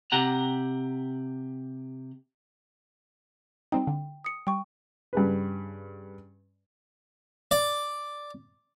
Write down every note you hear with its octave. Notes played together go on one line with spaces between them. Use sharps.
C3 G4 F#5 A#5
G3 C4 D#4 G5
D3
D#6 C#7
G3 G5 C#6
G2 C#3 B4
D5